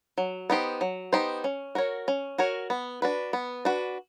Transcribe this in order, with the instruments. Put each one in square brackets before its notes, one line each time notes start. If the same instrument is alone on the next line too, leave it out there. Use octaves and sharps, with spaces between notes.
[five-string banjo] F#3
B3 D#4 G4 C5
F#3
B3 D#4 G4 C5
C#4
F#4 A#4 C#5
C#4
F#4 A#4 C#5
B3
D4 F#4 B4
B3
D4 F#4 B4